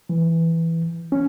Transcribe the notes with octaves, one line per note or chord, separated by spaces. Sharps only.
E3
C#4